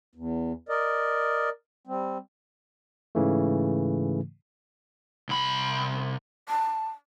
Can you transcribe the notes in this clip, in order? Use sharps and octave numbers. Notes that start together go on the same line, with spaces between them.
E2
A#4 D5 D#5
G3 C4
G#2 C#3 E3 A3
C2 B5
A5